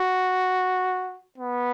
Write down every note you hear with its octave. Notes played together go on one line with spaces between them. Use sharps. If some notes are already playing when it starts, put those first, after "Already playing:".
Already playing: F#4
B3